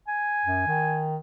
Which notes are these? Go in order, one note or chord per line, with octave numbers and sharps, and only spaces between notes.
G#5
F#2
D#3